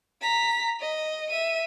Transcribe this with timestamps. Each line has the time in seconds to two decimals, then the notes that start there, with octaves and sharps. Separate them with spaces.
0.21 A#5 B6
0.80 D#5
1.29 E5 D#7